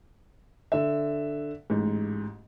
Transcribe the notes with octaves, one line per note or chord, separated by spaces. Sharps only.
D3 E5
A1 G#2